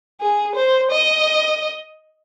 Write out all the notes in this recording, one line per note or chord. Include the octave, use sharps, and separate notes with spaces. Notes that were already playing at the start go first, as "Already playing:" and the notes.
G#4
C5
D#5